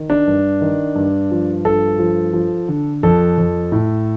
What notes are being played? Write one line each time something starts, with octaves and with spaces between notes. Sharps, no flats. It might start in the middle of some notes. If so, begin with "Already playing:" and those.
Already playing: D#3
D4
G2
D#3
G2
F3
G2 A4
F3
F3
D3
F2 A4
F2
A2